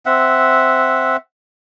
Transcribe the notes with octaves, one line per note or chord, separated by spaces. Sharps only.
C4 E5 F#5